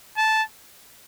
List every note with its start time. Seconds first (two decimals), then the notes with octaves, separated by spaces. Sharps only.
0.18 A5